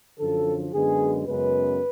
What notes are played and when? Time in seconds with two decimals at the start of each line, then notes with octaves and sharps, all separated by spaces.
0.18 F#2 D3 F3 A4
0.72 F#2 D3 G#3 B3 G#4
1.26 F#2 C#3 G#3 B3 B4